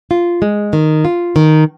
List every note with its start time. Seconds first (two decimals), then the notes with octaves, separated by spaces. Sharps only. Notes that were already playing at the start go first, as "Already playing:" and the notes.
0.11 F4
0.42 G#3
0.73 D#3
1.05 F4
1.36 D#3